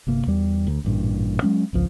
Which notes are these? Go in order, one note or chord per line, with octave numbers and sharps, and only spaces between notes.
G1 C3 A#3
E2 G3
D2
A1 G2 A#2
F#3 G#3 C#4
G#1 C#2 F3